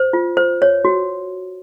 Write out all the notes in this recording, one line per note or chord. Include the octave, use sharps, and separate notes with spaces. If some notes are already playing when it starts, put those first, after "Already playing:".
Already playing: C5
F4
C5
C#5
F#4